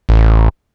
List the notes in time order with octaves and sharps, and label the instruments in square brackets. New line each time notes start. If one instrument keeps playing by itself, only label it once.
[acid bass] A1